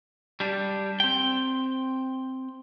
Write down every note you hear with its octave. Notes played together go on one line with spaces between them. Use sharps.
G3 D4
C4 G5